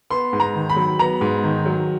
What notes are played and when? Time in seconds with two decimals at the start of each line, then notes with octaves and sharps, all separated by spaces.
0.10 B3 C6
0.33 G#2
0.40 A#5
0.55 D#3
0.70 B5
0.76 F#3
0.99 B3 A#5
1.21 G#2
1.44 D#3
1.66 F#3